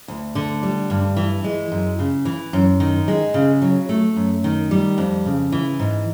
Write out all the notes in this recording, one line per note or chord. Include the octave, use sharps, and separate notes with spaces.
D2
D3
G3
G2
E3
G#3
F#2
C#3
E3
F#2
D#3
G#3
C#3
F#3
A3
F#2
D#3
G3
F2
C#3
E3
G#2